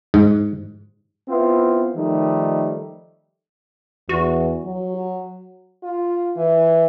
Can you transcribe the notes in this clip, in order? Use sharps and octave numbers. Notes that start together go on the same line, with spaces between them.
G#2
B3 C4 E4 F4
D#3 F3 G3 A3 D#4
E2 F#4
F#3
F4
E3